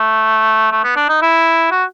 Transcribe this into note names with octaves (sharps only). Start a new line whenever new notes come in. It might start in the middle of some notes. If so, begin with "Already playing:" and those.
Already playing: A3
A3
B3
D4
D#4
E4
F#4